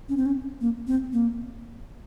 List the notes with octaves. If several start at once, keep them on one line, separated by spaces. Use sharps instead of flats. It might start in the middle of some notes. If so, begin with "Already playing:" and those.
C#4
C4
C#4
A#3
C4
A#3